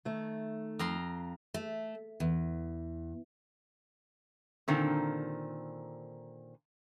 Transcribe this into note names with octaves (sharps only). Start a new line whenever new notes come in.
D#3 A3
F2 A#5 C6
A3
E2
A#2 D3 D#3 C4